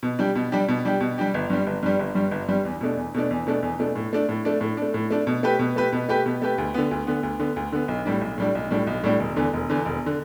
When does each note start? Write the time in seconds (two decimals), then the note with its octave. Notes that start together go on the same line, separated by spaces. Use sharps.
0.03 B2
0.19 G3 D4 G4
0.35 B2
0.52 G3 D4 G4
0.68 B2
0.85 G3 D4 G4
1.01 B2
1.18 G3 D4 G4
1.34 G1
1.50 G2 G3
1.67 G1
1.83 G2 G3
1.99 G1
2.15 G2 G3
2.31 G1
2.48 G2 G3
2.65 E2
2.81 B2 A3 D4
2.97 E2
3.14 B2 A3 D4
3.30 E2
3.47 B2 A3 D4
3.63 E2
3.79 B2 A3 D4
3.96 A2
4.13 A3 D4
4.29 A2
4.45 A3 D4
4.61 A2
4.77 A3 D4
4.94 A2
5.10 A3 D4
5.27 B2
5.43 A3 G4 B4
5.59 B2
5.76 A3 G4 B4
5.93 B2
6.09 A3 G4 B4
6.26 B2
6.42 A3 G4 B4
6.58 D2
6.74 D3 B3
6.91 D2
7.07 D3 B3
7.23 D2
7.39 D3 B3
7.56 D2
7.72 D3 B3
7.88 B1
8.06 A2 G3 D4
8.21 B1
8.38 A2 G3 D4
8.55 B1
8.71 A2 G3 D4
8.87 B1
9.04 A2 G3 D4
9.20 E1
9.37 E2 D3
9.53 E1
9.70 E2 D3
9.85 E1
10.06 D3